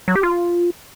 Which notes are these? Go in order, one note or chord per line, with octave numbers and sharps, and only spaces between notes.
F#3
G4
F4